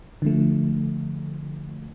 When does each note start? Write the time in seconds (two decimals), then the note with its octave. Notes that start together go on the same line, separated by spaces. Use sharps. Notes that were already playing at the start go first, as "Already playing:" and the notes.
0.22 D3 F3 A3